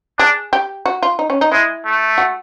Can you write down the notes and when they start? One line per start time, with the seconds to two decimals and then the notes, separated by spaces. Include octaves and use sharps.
0.19 D4 G#4
0.53 G4
0.86 F#4
1.03 F4
1.19 D#4
1.30 C#4
1.41 D#4
1.52 G#3 E4
1.85 A3
2.18 F#4